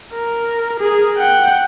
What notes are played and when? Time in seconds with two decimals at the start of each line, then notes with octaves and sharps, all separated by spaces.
0.14 A#4
0.80 G#4 A#4
1.18 F#5 G5